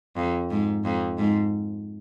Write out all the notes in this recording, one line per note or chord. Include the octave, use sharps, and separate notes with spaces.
F2
G#2
F2
G#2